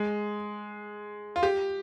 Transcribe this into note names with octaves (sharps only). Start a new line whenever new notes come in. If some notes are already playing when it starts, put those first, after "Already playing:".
Already playing: G#3
F4
G4